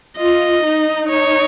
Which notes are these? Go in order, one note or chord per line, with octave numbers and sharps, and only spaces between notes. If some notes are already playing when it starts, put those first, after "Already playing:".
F4 D#5
D#4
C#5